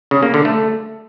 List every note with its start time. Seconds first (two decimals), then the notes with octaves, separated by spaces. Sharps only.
0.11 C#3
0.23 A#3
0.34 D3
0.45 A3